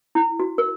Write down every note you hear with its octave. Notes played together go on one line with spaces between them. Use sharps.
E4
F#4
A#4